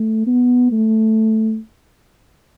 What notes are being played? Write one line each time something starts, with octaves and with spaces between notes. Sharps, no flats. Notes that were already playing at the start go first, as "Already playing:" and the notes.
Already playing: A3
B3
A3